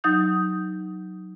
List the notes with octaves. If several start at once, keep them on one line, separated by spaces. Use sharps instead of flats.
F#3 D#4 D#6 G6